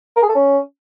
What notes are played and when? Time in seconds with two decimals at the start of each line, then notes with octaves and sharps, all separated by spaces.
0.16 A#4
0.22 G#4
0.29 A4
0.35 C#4